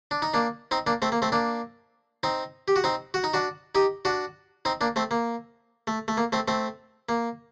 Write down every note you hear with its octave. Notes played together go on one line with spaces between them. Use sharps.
D4
D#4
A#3 D4
C4 D#4
A#3 D4
A3 C4
A#3
A3 C4
A#3 D4
C4 D#4
G4
F#4
C4 D#4
F#4
D#4
D4 F#4
D#4 G4
D4 F#4
C4 D#4
A#3 D4
A3 C4
A#3
A3
A3
A#3
A3 C4
A3 C4
A#3